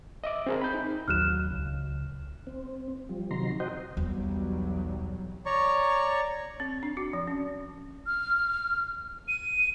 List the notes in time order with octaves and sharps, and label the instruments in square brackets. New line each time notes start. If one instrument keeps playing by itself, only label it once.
[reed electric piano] D#5 E5 D6
C4 G#4 A#4
B5 G6
D#4
[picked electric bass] A1 D#2 F#3 [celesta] F6 F#6 E7
[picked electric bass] C#2
[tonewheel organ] C4
F3 G3
C3 D#3 F#3 A#5 C6
F#4 C5 D#5 G5
[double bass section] B1 F#3 G3 [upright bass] E2
[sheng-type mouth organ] C#5 D5 A#5 C#6
[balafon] C4
D4
F#4
F3
C#4
[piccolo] F6
D#7